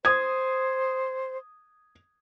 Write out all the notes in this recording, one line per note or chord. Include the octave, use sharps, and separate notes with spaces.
C5 D#6 G#6